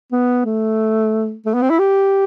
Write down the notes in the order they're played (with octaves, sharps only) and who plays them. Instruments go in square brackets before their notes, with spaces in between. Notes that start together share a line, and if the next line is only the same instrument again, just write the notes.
[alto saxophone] B3
A3
A3
B3
C4
E4
G4